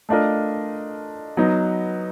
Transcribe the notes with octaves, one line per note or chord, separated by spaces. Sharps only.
A3 D4 F4 A#4 D#5
F#3 B3 D#4